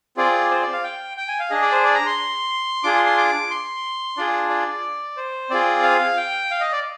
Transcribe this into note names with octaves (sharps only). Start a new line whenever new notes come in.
C4 F4 G#4 D5
C5
D5
F5
G5
G5
G#5
F5
D4 G#4 D#5
D5
C5
D5
A#5
C6
D4 F4 G#4 D6
C6
C6
D6
C6
D4 F4 G#4 D5
D5
C5
C4 F4 G#4 D5
F5
G5
F5
D#5
D5